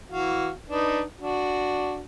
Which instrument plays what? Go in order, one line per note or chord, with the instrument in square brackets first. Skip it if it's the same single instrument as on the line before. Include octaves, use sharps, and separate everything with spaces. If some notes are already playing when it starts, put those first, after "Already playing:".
[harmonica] E3 F#4 F5
D4 D#4 B4
D4 F#4